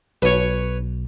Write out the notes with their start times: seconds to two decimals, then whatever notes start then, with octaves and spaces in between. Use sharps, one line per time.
0.22 B1 B2 B4 C#5